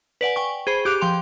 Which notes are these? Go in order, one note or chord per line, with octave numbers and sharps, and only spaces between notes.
B4 D5 F#5 G#5
G5 G#5 C#6
G#4 C5 B5
G4 D6 F#6 F7
F3 G5 C6 F7